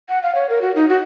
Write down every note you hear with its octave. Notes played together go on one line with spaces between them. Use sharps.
F#5
F5
C#5
A#4
F#4
D#4
F#4